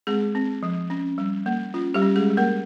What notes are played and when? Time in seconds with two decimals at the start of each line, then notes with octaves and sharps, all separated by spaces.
0.07 G#3 C4 G#4
0.35 C4
0.63 F3
0.90 C#4
1.18 G3
1.46 A#3
1.74 C#4 F4
1.94 G3 G4
2.01 C#4
2.16 G#3 G#4
2.30 G3
2.37 A#3 A#4